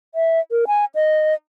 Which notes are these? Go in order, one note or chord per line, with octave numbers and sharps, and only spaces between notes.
E5
A#4
G#5
D#5